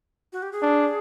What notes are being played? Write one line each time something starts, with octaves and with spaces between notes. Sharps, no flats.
F#4
G4
G#4
D4